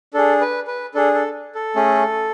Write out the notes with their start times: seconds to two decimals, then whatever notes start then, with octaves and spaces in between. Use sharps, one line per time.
0.14 D4 G#4 A4
0.41 B4
0.67 B4
0.94 D4 G#4 A4
1.15 A4
1.55 A4
1.75 A3 C#4 G#4